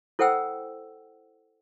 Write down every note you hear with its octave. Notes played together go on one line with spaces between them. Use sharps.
E4 A4 C5 F#5 G5 E6